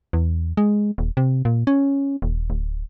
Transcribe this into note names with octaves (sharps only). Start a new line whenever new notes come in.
E2
G#3
D#1
C3
A#2
C#4
D#1
D1